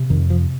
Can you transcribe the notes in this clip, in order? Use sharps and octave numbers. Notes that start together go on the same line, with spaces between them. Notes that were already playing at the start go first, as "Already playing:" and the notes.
Already playing: C3
F2 D#3
F3